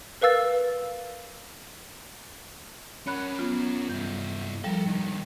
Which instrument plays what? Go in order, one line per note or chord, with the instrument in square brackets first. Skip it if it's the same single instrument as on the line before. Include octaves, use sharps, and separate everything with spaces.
[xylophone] A#4 B4 F5 E6 A6
[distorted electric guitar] C#4 A#4 [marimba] C#5 B5 F#6
[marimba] F#3 B3 F4
[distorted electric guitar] G2 E4 [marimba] G6
[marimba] F3 G3 [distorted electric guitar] A4 A#4
[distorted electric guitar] C#2 D#3